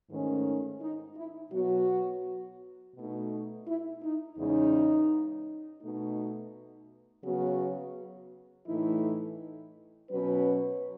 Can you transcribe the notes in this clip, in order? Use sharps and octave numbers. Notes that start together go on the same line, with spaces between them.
G#2 D#3 A3 C#4
D#4
E4
B2 F#3 B3 F#4
B2 A3 D#4
E4
D#4
E2 C#3 G#3 C#4 D#4
B2 A3 D#4
C#3 F#3 B3 F#4
A2 E3 A3 D#4 E4
B2 F#3 C#4 B4